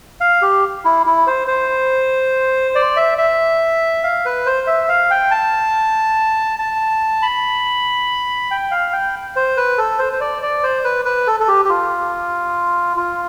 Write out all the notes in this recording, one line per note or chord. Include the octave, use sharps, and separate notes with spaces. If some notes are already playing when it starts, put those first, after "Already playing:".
F5
G4
E4
E4
C5
C5
D5
E5
E5
F5
B4
C5
E5
F5
G5
A5
A5
B5
G5
F5
G5
C5
B4
A4
C5
C5
D5
D5
C5
B4
B4
A4
A4
G4
G4
F4
F4